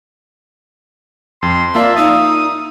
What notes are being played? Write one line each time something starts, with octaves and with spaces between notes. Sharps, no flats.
F2 C6
A#3 F4 D5 E5 A5
D#4 F5 D#6 E6